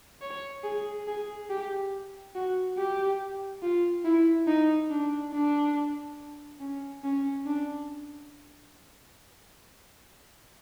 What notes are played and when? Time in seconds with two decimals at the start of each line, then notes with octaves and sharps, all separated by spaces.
0.21 C#5
0.64 G#4
1.07 G#4
1.50 G4
2.35 F#4
2.78 G4
3.62 F4
4.05 E4
4.47 D#4
4.90 D4
5.33 D4
6.60 C#4
7.04 C#4
7.46 D4